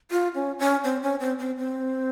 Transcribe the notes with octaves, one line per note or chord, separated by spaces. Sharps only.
F4
C#4
C#4
C4
C#4
C4
C4
C4